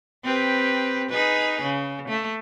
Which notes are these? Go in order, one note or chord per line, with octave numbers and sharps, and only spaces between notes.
C4 G4 B4
D#4 G#4 B4
C#3
A3